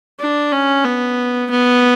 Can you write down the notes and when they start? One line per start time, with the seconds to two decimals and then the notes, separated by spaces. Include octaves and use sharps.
0.20 D4
0.52 C#4
0.85 B3
1.51 B3